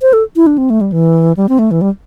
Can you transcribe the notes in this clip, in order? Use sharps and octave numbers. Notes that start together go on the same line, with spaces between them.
C5
A4
E4
D4
C4
A3
G3
E3
G3
C4
A3
E3
G3